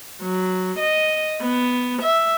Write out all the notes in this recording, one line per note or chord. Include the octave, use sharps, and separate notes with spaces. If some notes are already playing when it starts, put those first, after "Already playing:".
F#3
D#5
B3
E5